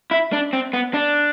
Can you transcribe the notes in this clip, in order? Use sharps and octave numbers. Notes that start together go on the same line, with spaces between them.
E4
D4
C4
B3
D4